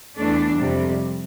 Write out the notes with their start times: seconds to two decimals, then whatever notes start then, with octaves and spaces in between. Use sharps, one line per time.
0.17 E2 E3 A3 D4
0.58 F2 C3 G3